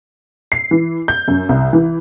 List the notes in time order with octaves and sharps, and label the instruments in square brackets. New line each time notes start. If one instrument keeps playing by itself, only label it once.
[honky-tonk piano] C7
E3
G6
F#2
C2
E3